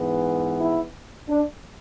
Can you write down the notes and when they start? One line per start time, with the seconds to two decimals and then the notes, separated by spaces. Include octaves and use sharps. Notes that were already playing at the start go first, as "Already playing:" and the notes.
Already playing: G#2 E3 B3
0.59 E4
1.29 D4